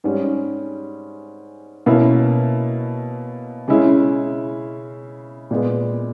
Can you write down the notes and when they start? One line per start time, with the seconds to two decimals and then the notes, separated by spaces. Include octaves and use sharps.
0.04 G#2 G3 C#4
1.86 B2 A#3 C#4 E4
3.68 C#3 G#3 C#4 E4
5.51 A#2 G#3 B3